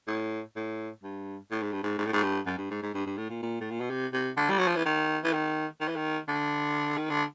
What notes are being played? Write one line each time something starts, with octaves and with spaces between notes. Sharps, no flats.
A2
A2
G2
A2
G#2
G2
G#2
G#2
A2
G#2
G2
F#2
G2
G#2
G#2
G2
G2
A2
A#2
A#2
A2
A#2
B2
C3
C3
D3
G3
F#3
F3
E3
D#3
E3
D#3
D#3
E3
D#3
D3
D#3
D3